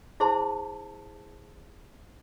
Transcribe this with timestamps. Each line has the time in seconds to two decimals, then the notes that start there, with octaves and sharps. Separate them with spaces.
0.20 E4 G#4 C5 A5 C6